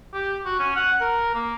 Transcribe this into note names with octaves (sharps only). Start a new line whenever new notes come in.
G4
F#4
C#4
F#5
A#4
A#3